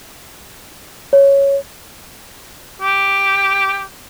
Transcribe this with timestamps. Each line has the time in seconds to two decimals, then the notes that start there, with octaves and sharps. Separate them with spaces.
1.13 C#5
2.82 G4